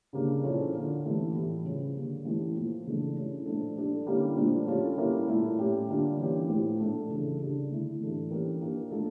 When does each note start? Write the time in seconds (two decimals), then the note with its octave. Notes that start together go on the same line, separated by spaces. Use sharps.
0.13 C#3 G3 A#3 D4
0.44 A#2 F3 C#4 E4 A4
0.73 D3 F3 A#3
1.03 E3 A3 C#4 E4 G4
1.34 A2 E3 G3
1.64 C#3 F3 C#4
1.95 D3 G3 A#3
2.25 E3 A3 C#4 E4 G4
2.55 A#2 F3 A#3
2.85 C#3 E3 A3 D4 A4
3.15 G3 C#4 E4
3.46 A#2 F3 A3 D4 A4
3.76 G3 D4 A4
4.06 D3 G3 A#3 C#4 E4
4.36 A#2 F3 A3 D4 F4
4.67 G3 C#4 F4 A4
4.97 G3 A#3 C#4 E4 A#4
5.28 A#2 A3 E4
5.58 A2 G3 C#4 G4
5.88 D3 G3 A#3 D4 F4
6.18 E3 A#3 C#4 G4
6.49 A2 F3 A3 E4 G4
6.78 A#2 A3 D4 A4
7.09 C#3 E3 G3 D4 A4
7.40 C#3 G3 D4
7.70 D3 A3 E4
8.00 A2 E3 G3 D4 A4
8.30 E3 A#3 C#4 G4 A#4
8.60 F3 A#3 D4 G4 A#4
8.91 A3 D4 F4 A4